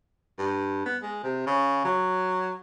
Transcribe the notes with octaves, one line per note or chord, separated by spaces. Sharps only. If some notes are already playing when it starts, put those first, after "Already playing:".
G2
B3
G#3
C3
C#3
F#3